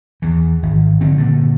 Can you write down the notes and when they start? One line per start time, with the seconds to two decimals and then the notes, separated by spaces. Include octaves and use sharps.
0.22 E2 E3
0.63 G#1
1.01 D3 F3 C4
1.17 G2 A#2 D3